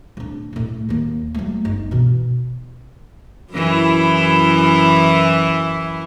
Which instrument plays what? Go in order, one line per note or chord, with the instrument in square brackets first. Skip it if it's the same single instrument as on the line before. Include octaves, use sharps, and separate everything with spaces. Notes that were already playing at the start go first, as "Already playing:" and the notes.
[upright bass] D1 D4
D1 A2
D#2 A#3
F#3 A3
G1 D#4
B2 E3
[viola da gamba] F#2 E3 E4